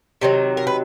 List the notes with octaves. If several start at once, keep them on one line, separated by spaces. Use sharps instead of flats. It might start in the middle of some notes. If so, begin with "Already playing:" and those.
C3 D#3 F#3
A#4
B4